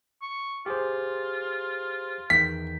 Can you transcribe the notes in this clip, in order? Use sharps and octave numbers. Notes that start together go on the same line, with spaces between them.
C#6
F4 G4 G#4 C5
E2 D#3 G5 B6